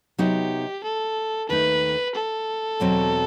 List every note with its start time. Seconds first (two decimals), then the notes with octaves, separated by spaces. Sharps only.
0.18 C3 F#3 B3 D#4 G4
0.84 A4
1.49 D#2 D#3 A3 D#4 B4
2.15 A4
2.80 E2 B2 F#3 C4